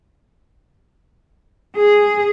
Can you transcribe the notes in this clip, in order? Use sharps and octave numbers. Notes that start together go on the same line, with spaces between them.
G#4